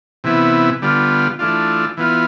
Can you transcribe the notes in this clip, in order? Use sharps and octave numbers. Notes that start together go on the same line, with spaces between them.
C3 E3 B3 E4
D3 G3 B3 F4
E3 A3 D4 F4
E3 B3 F4